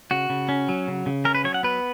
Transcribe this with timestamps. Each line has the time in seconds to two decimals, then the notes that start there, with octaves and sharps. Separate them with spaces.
0.11 C#3 F#4
0.30 C#3
0.49 C#4
0.69 F#3
0.88 C#3
1.06 C#3
1.25 C#4 A#4
1.35 B4
1.44 F#3 C#5
1.54 F#5
1.63 B3 B4